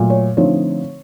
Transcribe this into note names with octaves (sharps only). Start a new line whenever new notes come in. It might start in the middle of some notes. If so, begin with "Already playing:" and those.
Already playing: A#2 F#3 A3
C#5
D3 F3 A3 C4 D#4 C#5